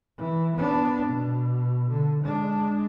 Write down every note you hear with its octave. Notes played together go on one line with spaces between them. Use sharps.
E3
B3 D4
B2
D3
G#3 D4